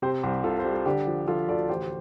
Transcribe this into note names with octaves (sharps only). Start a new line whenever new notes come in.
C3 G4 C5
C2 G4 C5
C3 F4 A4
C5
G3
A4
D3 D4 G4
F3
F3 F4 A4
D2 A4 D5
A1 G4 C5